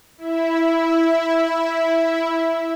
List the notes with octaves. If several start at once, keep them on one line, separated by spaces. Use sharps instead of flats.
E4 E5